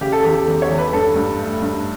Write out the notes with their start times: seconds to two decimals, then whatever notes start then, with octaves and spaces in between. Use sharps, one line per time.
0.01 C#3 G4
0.12 A4
0.24 E2 G4
0.35 A4
0.48 E2
0.62 C#5
0.70 E2
0.78 B4
0.93 G2 A4
1.16 G2
1.39 A3
1.62 G2